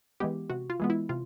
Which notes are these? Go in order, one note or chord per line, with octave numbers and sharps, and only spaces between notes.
E3 G#3 B3 G4
C3 F#4
F4
E3 G#3 B3
E4
C3 F4